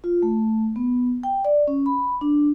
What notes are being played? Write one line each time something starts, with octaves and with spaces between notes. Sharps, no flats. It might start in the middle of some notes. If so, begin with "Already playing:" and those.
F4
A3
B3
G5
D5
C#4
B5
D4